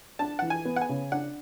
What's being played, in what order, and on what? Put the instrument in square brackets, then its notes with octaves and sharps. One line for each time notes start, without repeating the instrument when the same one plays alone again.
[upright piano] D4 [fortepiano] A5
[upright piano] E3 [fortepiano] F#5
[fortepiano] G#5
[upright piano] B3
[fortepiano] F#5
G#5
[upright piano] C#3
[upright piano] D4 [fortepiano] F#5